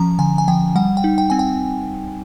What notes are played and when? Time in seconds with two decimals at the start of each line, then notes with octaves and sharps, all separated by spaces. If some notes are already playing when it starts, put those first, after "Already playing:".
Already playing: F3 C#4 A#5
0.19 D3 G#5
0.38 G#5
0.48 F3 G5
0.75 G3 F#5
0.97 G5
1.04 D#4
1.18 G5
1.30 C4 G#5
1.39 G5